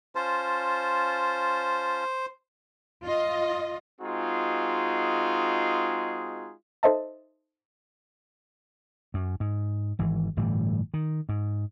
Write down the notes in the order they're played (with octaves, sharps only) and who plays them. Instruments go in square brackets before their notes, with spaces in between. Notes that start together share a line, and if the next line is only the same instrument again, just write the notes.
[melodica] C#4 F4 A5 [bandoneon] C5
[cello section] F4 D#5
[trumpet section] G#3 C4 D#4 F4 F#4 G#4
[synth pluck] D#4 A4 C5 D#5 E5 A5
[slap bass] F#2
G#2
G#1 E3
G1 A2 E3 G3
D#3
G#2